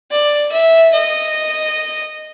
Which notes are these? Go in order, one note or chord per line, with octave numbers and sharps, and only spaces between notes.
D5
E5
D#5